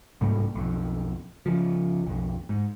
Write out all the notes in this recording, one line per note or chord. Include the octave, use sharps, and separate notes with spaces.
C2 G#2 G3 A#3
B1 F2
C#2 F3
B1 F2
G#2